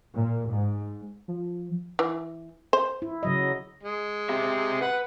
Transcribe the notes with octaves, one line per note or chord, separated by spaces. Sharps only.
A#2
G#2
F3
E3
C5
E4
C#3 F#3 D#5
G#3
C4 G4 E5
B4 F#5